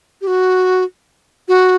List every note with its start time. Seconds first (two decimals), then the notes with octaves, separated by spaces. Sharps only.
0.21 G4
0.27 F#4
1.48 F#4